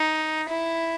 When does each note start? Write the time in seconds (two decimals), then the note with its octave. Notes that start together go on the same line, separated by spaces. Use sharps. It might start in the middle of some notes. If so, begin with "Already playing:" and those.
Already playing: D#4
0.49 E4